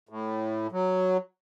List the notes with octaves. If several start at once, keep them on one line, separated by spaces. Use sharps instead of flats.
A2
F#3